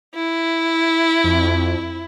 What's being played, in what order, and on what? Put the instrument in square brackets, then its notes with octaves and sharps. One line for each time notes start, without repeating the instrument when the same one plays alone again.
[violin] E4
[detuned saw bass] F2